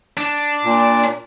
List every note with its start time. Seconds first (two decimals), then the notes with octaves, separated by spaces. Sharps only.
0.17 D4
0.64 A#2